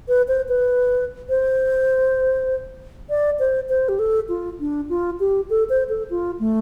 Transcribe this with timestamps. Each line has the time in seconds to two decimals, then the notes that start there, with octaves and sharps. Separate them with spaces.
0.08 B4
0.28 C5
0.49 B4
1.29 C5
3.10 D5
3.39 C5
3.69 C5
3.89 G4
3.99 A4
4.29 F4
4.60 D4
4.89 F4
5.20 G4
5.50 A4
5.70 C5
5.89 A4
6.10 F4
6.40 A3